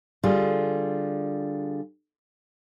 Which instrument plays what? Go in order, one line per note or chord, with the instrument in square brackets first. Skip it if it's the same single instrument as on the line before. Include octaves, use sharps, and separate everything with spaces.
[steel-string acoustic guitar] D3 G3 F4 G#4